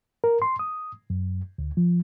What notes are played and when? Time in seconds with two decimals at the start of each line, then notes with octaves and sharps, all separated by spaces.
0.24 A#4
0.42 C6
0.59 D#6
1.10 F#2
1.58 D2
1.77 F3